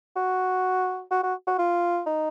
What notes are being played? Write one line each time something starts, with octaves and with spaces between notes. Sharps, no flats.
F#4
F#4
F#4
F#4
F4
D#4